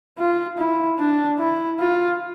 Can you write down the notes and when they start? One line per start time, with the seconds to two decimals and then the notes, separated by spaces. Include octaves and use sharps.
0.19 F4
0.58 E4
0.99 D4
1.39 E4
1.79 F4